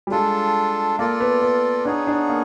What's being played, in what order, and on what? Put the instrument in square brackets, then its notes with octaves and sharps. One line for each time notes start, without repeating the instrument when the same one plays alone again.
[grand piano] G3
[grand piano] G#3 [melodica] D4 F4 A4
[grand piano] A#3 [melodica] F4 A4 D5
[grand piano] B3
B3
[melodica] B3 D#4 G#4 C#5 [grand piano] D4
[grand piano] D4
A#3